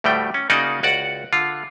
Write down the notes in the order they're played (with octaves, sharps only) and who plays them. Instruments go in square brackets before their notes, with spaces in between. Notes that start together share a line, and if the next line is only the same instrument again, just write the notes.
[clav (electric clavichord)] D2 A2 G3 A3 G5
C#4
C#3 A#3 D#4 F#4 D5 D#5
C#2 F#4 D5 F#5
D3 F4